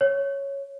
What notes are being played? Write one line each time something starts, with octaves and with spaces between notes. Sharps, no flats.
C#5